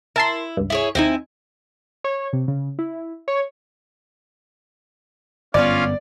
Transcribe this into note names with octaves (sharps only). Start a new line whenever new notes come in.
E4 A#4 A5 C6
C#2 G2
E4 G#4 C#5
D#2 C4 D#4 E4 G#5
C#5
C3
C#3
E4
C#5
G1 F#2 B3 C#4 F4 D5 F5